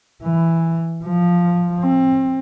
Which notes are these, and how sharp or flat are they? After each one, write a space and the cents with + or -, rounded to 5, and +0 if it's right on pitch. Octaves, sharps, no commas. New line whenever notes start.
E3 +5
F3 +5
C4 +25